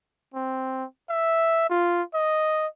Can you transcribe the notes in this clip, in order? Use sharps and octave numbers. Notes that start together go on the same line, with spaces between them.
C4
E5
F4
D#5